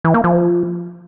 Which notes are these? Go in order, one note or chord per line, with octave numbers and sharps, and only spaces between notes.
E3
A#3
F3